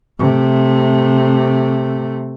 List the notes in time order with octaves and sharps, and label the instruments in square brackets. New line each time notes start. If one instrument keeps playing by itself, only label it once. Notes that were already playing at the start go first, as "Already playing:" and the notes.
[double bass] C3 A3